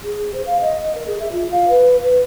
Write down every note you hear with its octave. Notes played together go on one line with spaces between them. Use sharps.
G#4
C5
F5
D#5
A#4
G#4
E5
F4
F5
B4
B4